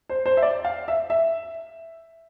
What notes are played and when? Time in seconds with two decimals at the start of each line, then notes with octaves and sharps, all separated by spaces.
0.09 C5
0.26 C5
0.37 E5
0.42 D5
0.65 F5
0.88 E5
1.10 E5